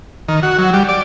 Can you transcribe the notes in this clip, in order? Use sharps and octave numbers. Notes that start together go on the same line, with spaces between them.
D#3
F#4
F#3
G3
D5